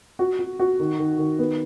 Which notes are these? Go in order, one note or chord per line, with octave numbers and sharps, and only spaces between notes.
F#4
F#4
F#4
D#3
D#3
D#3
B3